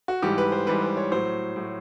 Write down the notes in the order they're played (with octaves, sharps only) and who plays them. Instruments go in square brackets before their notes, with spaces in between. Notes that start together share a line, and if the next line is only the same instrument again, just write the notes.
[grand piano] F#4
G#2 E3 G3 G4
B4
C5
G#2 E3 G3 B4
C5
C#5
A2 F#3 C5
A2 F#3